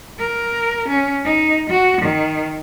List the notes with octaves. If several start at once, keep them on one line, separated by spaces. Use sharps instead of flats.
A#4
C#4
D#4
F#4
D#3